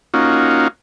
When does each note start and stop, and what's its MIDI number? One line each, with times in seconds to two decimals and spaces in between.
0.14 0.68 58
0.14 0.68 61
0.14 0.68 63
0.14 0.68 65
0.14 0.68 66